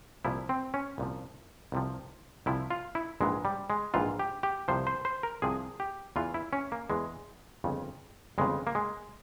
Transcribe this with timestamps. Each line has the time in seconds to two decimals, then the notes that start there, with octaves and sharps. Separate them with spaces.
0.25 C2 A#2 F3 E4
0.49 C4
0.74 C#4
0.98 C2 A#2 F3
1.72 C2 C3 F3
2.46 C2 C3 F3 E4
2.71 F4
2.95 E4
3.21 A#1 G#2 E3 G#3
3.45 G3
3.70 G#3
3.94 A#1 G#2 E3 F4
4.19 G4
4.43 G4
4.68 C2 C3 F3 C5
4.87 C5
5.05 C5
5.23 A#4
5.42 C2 C3 F3 G#4
5.80 G4
6.16 E2 E3 F4
6.34 E4
6.53 C#4
6.72 A#3
6.90 E2 E3 G#3
7.64 G1 F2 C#3
8.38 G1 F2 C#3 G#3
8.67 A#3
8.75 G#3